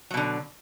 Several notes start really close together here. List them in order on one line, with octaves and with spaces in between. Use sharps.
F#3 B2 D3